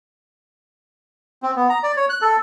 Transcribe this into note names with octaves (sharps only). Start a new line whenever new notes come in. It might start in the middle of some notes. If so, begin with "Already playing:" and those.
C4
B3
A#5
D5
C#5
F#6
A4